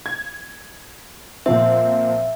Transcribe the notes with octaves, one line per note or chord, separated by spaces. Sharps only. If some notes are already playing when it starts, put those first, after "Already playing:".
G#6
A#2 F3 C4 E5